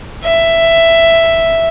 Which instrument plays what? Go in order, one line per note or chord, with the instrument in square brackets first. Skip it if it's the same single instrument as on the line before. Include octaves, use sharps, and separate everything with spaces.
[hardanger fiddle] E5